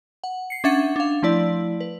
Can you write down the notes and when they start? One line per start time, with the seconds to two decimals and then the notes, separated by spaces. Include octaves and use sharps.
0.24 F#5
0.50 C7 C#7
0.64 C#4 D4 E5 F#5 A6 C#7
0.96 D4 F5
1.23 F3 A3 E4 D5
1.80 B4